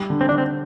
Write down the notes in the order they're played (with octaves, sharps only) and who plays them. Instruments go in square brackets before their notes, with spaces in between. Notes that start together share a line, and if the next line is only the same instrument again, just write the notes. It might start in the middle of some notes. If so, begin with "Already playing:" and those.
Already playing: [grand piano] G3
D3
[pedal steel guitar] C4
[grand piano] D3 [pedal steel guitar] D4
[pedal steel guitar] C4